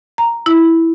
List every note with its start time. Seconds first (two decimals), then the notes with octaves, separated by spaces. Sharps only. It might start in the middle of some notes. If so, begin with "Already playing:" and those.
0.18 A#5
0.46 E4